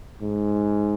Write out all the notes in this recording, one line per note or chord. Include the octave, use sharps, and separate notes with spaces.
G#2